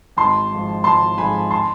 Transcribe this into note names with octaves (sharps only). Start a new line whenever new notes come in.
G#1 A5 C6
G#2 F3
G#1 A5 C6
G#2 F3 G#5 B5
A5 C6